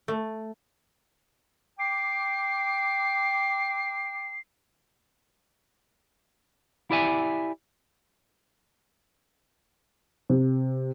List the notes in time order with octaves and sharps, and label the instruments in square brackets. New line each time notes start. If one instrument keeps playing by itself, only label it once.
[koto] A3
[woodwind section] G5 D6 [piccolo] C7
[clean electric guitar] E4 G4 D5 E5 G#5
[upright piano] C3